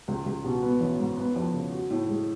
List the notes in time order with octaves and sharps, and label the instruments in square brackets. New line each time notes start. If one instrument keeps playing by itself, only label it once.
[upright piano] C#2
C#2
B2
B3
A1
G#2
B3
F2
C#3
F#4
A2
G#3